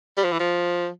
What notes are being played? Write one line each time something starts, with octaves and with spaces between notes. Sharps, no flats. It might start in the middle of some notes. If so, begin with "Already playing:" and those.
G3
F3
E3
F3